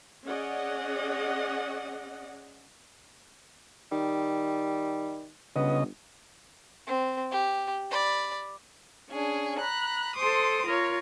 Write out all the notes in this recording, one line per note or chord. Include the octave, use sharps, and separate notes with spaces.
C#4 G#4 D5 D#5 F#5
D#3 G3
G1 C#3 B3 D#5
C4
G4
D5 B5
C#4 D4 G#4
A#5 B5 F#6
A4 C5 C6 D6 D#6
F4 A#4 C#5